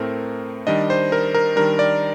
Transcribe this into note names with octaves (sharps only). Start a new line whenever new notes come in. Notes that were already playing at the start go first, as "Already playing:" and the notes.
Already playing: A2 A3 C4 A#4
D#3 G3 D4 D#5
C5
A#4
A#4
D#3 G3 D4 A#4
D5